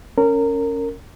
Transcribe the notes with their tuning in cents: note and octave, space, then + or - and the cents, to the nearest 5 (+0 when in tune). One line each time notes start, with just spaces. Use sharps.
C#4 +0 A#4 -20